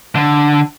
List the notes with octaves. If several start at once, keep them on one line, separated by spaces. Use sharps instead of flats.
D3